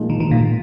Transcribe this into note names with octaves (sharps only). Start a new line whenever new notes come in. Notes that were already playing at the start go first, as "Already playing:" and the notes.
Already playing: A#2 F3 G#3 D#4
D#3
D#3
A#2